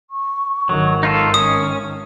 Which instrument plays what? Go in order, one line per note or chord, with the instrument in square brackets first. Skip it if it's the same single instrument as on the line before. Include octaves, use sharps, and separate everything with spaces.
[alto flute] C#6
[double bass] G#1 D#3 [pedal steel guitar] F#3
[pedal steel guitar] D#4 F4 A4
[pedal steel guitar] C#4 [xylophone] D#6